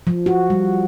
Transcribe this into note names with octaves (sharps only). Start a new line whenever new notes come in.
F3
F#4
G3